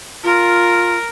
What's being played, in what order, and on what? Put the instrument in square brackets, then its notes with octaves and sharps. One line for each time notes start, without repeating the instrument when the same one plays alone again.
[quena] F4 [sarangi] A#4